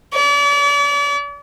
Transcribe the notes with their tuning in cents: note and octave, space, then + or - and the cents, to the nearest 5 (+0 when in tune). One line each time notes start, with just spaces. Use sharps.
D5 -40